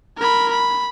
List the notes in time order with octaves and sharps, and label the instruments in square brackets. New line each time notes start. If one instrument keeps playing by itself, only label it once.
[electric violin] A#4 B5
B5